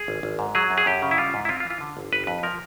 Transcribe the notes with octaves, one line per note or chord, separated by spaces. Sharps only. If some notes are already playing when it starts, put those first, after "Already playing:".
Already playing: G#4
G#1
G#1
G#2
F#3 G#4
F#2
G#4
F#2 G4
C#3
E4
G3 F4
G#2
E4
C4 F4
F4
E3
F4
D3
G1
G1 B4
F2 B4
F3 A#4